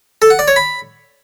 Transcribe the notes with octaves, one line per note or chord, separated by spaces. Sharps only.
A4
F#5
D5
C#5
B5